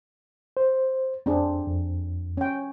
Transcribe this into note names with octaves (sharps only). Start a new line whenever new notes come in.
C5
F2 C4 D4 G#4
F2
C#4 G5